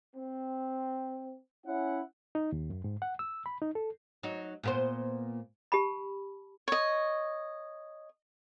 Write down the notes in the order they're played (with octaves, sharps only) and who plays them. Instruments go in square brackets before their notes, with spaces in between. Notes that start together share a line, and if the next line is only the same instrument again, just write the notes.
[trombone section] C4
[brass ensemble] C#4 E4 F#5
[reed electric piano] D#4
D#2
F#2
G#2
F#5
E6
B5
D#4
A4
[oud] F#3 D#4
A#2 B3 C5
[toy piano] G4 A5 B5
[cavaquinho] C#5 D#5